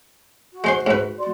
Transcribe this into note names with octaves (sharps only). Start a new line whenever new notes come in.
F#4
G#3 C5 C6
G#2 B4
F#4 D5 C6